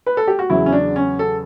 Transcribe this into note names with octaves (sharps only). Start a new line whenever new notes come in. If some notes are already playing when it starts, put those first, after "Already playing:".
B4
A4
G4
F#4
E2 C#3 F#3 E4
C#4
D4
C#4
A4